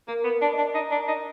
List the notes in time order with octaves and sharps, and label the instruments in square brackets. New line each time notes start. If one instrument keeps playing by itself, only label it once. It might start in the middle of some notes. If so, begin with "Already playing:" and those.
[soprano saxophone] A#3 [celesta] A#4
[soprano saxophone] B3
[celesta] A#4
[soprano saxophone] D4
[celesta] D#5
[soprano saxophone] D4
[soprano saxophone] D#4 [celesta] A#5
[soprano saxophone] D4
[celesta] A#4
[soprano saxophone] D#4